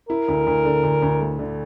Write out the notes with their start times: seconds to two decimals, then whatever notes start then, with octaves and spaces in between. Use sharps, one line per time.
0.09 E4 A#4
0.28 D2
0.47 D2
0.65 D3
0.83 D2
1.02 D2
1.21 A3
1.39 D3